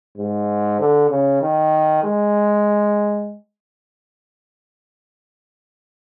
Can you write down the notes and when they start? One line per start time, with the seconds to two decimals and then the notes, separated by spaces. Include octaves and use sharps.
0.17 G#2
0.80 D3
1.10 C#3
1.42 D#3
2.04 G#3